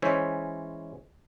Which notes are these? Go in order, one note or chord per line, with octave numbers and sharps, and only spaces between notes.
E3 G#3 C#4 C5 C#5 E5